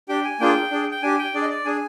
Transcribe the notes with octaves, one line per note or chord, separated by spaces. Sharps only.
D4 G4 G5
G#5
A#3 D4 F4 G#4 G5
D4 G#4
G5
D4 G4 G#5
G5
D4 G#4 D5
D#5
D5
D4 G#4 G#5